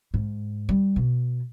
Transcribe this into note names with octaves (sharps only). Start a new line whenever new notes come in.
G#2
G3
B2